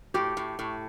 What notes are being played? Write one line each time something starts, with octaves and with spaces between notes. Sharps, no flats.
A2 G4
A2
A2